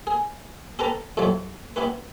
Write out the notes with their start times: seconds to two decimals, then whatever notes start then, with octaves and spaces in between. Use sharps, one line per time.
0.07 G#4
0.79 G4 A4 B4 G5 A5 A#5
1.17 F2 A2 C3 F3 F#3
1.76 B3 E4 G4 B4